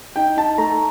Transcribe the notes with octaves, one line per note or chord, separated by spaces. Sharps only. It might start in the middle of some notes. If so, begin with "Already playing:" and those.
D#4 G5
D#4 A5
A3 A#5